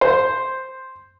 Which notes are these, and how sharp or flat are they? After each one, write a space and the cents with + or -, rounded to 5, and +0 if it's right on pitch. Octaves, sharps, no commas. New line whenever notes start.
C5 +0